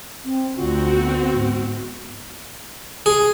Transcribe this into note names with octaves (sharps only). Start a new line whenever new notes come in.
C4
D2 D3 C4 F4 F#4
B3
G#2
G#4